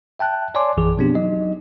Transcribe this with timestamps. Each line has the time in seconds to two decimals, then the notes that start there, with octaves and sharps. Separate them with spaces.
0.19 E5 G5 A5 F#6
0.55 C#5 D5 G#5 A5 C6 D6
0.77 A#1 F#2 E3 G#4 D6
0.98 B2 F3 B3 C4 D4 G4
1.15 F#3 D#4 D#5